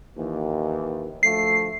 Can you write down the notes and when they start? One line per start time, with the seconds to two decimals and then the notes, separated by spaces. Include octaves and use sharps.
0.17 D#2 E3
1.23 D2 F3 A3 C7